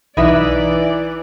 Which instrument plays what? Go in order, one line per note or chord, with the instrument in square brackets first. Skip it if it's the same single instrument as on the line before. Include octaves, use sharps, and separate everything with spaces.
[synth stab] B1 E4 [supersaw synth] E3 [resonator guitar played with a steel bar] D#4 B4 E5 [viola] D5